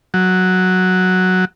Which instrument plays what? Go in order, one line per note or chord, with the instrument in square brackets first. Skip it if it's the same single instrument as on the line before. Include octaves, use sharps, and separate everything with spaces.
[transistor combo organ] F#3